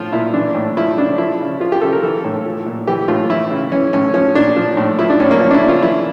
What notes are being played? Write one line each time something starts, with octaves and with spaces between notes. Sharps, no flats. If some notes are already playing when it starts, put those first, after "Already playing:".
Already playing: A2 F3 F4
A#2 E4
E3 D4
A2
F3 E4
C#3 D4
F3 E4
C#3
F3 F4
G4
C#3 A4
A#4
E3 A4
A2
F3
A#2
E3 G4
A2 F4
E3 E4
C#3
E3 C#4
A2 C#4
F3 C#4
A#2 D4
F3
A2
F3 E4
D4
A2 C#4
A#3
F3 C#4
D4
E4
C#3
F4
E3 E4